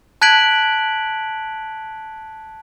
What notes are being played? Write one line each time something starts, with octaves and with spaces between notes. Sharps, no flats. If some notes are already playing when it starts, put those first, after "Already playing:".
A5 F#6 G#6 B6 D7 F#7